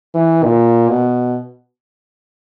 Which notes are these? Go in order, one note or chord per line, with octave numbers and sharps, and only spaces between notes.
E3
A#2
B2